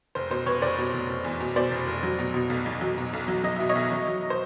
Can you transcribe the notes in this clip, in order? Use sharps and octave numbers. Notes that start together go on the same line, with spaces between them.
F1 C5
B2 C5
F1 B4 C#5
F1 C5 D5
B2
F1
F1
E2
B2
B2 C5 D5
F1
F1
F#3
B2
B2
B1
B1
F#3
B2
B1
F#3
F#3 D#5
B2 E5
C#5 D#5
B1
F#3
F#3
C5